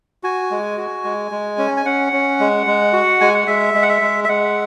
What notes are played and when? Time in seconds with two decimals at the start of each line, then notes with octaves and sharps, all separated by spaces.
0.23 F#4 G#5
0.51 G#3
0.78 F#4
1.04 G#3
1.31 G#3
1.58 C#4
1.77 G#5
1.85 C#4 F#5
2.13 C#4
2.40 G#3
2.67 G#3
2.93 F#4
3.21 G#3 G#5
3.34 F#5
3.47 G#3 E5
3.74 G#3
3.82 F#5
3.89 E5
4.02 G#3
4.24 E5
4.29 G#3 F#5